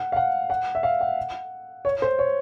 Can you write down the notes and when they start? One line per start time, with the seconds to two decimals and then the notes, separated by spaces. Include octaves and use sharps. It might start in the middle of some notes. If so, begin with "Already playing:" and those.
Already playing: F#5
0.12 F5
0.16 F#5
0.50 F#5
0.75 E5
0.83 F5
1.00 F#5
1.85 C#5
2.02 C5
2.19 C#5